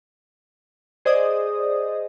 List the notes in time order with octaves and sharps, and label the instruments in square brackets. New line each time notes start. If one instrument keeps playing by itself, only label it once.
[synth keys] G#4 C5 D5 D#5 D#6